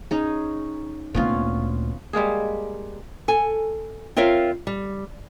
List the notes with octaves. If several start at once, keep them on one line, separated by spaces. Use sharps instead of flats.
C#4 D#4 G#4
D2 A#2 B3 C#4 F4
G3 G#3 A#3 G#4
A4 G#5
C4 F4 A#4 C#5 E5 F5
G3